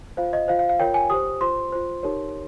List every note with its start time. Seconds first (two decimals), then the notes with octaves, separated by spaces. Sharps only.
0.17 F4 C5 F5
0.33 D#5
0.48 F4 C5 F5
0.59 F5
0.69 F5
0.79 F4 A#4 C#5 G5
0.94 G#5
1.10 G4 C5 D#6
1.41 F4 C5 C6
1.72 F4 C5
2.03 D#4 G4 A#4 C#5